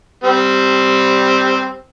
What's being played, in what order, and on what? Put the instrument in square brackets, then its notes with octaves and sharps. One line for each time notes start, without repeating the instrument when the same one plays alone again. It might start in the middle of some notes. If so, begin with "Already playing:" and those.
[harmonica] G3 C4